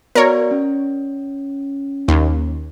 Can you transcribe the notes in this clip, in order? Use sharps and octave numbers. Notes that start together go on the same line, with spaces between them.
B3 F#4 A#4 C#5 D5
C#4
D#2